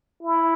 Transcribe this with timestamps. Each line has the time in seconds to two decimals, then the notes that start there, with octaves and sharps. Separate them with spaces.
0.23 E4